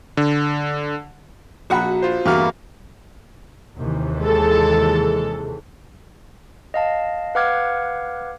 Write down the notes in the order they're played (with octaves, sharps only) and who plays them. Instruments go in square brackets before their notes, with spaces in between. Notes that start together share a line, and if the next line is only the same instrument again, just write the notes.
[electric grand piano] D3
[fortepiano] A#1 F#5 B5 [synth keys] F#4 A#5
[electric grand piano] F4 C5
[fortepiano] E2 F#4 [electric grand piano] G2 F6 [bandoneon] A#3 [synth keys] G5 B5
[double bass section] D#2 C3 E3
[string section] G#3 A4
[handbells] D#5 F5 A5
B4 F5 F#5 D6 F6 G#6